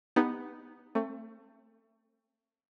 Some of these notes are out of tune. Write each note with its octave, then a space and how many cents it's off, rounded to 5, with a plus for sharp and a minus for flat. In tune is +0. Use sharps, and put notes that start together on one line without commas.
B3 +0 D#4 +0 G4 +20
A3 +30 C4 +35